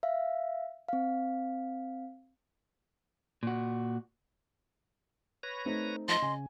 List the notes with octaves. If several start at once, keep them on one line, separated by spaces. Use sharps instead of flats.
E5 F5
C4 F5
A#2 F#4
B4 C#5 A#6
A3 C4 D#4
F3 D#5 A5 C6
C#3 G#5